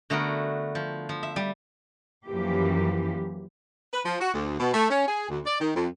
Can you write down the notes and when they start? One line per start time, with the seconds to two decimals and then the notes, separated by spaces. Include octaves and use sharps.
0.10 D3 A3 B3 F#4 A#4
0.75 F3
1.09 F3
1.23 E5
1.36 G3
2.27 F#2 E3 F3 A#3 G4
3.93 B4
4.06 F3
4.21 F#4
4.34 D2
4.60 B2
4.74 A3
4.91 C#4
5.08 G#4
5.29 D2
5.46 D5
5.61 D#3
5.76 F2